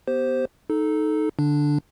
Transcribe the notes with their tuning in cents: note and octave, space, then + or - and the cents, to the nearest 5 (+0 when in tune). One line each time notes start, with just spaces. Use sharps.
B3 +0 G4 -10 C5 +0
D#4 +0 A4 -15
D3 +0 D4 +0